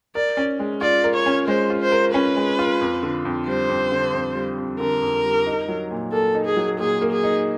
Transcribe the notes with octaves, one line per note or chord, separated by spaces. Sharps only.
A#4 D5
C#4
G#3
F4 D5
A#4
C#5
C#4
G#3 C5
F4
C5
A#4
C#4 B4
G#3
F4
F2
D3
F2
G3 C5
F2
D3
F2
G3
F2
D3 A#4
F2
G3
D#4
F#3
A#2
A#3 A4
D#4
G#4
F#3
A#2 G#4
A#3
G#4
D#4